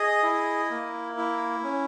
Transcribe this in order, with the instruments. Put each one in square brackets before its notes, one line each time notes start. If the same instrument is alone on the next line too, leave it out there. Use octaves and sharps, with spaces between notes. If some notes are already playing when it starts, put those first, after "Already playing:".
Already playing: [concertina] G#4 D#5
E4
A#3
E4
C#4